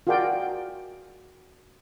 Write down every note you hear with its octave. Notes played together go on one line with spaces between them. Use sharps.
F4 F#4 G#4 A#4 D5 G5